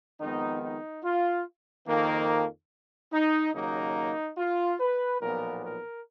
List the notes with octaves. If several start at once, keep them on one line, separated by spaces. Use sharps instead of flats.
F2 D#3 G#3 B3 D#4
D#4
F4
F2 D#3 A#3
D#4
D#2 C#3 F#3 A#3 D#4
F4
B4
B1 A#2 F3 B3 A#4
A#4